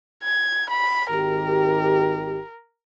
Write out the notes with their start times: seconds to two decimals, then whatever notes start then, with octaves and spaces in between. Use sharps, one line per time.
0.24 G#6
0.70 B5
1.10 G#1 D#3 G4 A#4